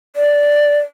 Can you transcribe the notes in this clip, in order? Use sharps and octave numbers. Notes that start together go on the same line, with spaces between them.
D5